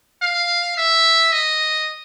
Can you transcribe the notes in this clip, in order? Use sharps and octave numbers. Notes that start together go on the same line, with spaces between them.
F5
E5
D#5